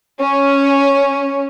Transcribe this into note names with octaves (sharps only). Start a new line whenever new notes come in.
C#4